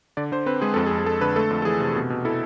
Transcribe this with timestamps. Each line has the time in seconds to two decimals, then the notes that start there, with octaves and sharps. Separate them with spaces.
0.17 D3 D5
0.32 D3 C5
0.46 C4 B4
0.62 G#3 G#4
0.74 F2 A4
0.86 G#4
0.91 F2
0.99 G#4
1.06 G#3 A4
1.21 D3 B4
1.36 A3 A4
1.50 F2
1.62 A4
1.65 E3 G#4
1.80 C3
1.96 B2
2.10 B2
2.25 E4 A4